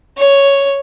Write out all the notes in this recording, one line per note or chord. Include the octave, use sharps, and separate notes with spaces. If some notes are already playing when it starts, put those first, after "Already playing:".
C#5